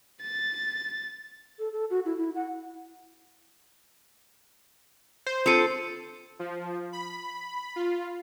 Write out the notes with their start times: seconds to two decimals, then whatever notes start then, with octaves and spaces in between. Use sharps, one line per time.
0.21 A6
1.59 A4
1.73 A4
1.90 F#4
2.05 E4
2.18 E4
2.35 F#5
5.27 C5
5.46 C4 F4 A4 C#7 D#7
6.39 F3
6.93 B5
7.76 F4